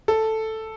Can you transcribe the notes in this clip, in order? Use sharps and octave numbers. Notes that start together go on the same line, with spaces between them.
A4